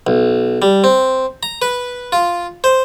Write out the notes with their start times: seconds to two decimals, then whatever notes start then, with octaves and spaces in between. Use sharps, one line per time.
0.07 B1
0.62 G3
0.84 C4
1.43 A#5
1.62 B4
2.12 F4
2.64 C5